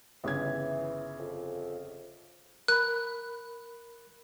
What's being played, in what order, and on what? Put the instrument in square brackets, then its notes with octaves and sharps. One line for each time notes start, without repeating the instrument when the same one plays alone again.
[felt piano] G1 C#3 G#6 [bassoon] E3
[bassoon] F2
[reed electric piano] A#4 B5 [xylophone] F#6